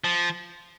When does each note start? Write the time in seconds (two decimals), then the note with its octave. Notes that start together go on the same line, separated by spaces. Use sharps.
0.04 F3